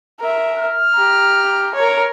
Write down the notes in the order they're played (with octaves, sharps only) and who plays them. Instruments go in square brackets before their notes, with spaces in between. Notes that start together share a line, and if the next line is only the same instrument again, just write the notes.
[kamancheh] A#4 E5
[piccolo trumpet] F6
[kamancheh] G4 A#5
A#4 C#5